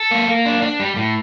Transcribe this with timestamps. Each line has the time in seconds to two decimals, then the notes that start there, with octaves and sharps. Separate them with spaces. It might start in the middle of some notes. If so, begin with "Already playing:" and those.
Already playing: A4
0.11 A#3
0.28 A#3
0.46 D4
0.62 D4
0.80 G3
0.96 A2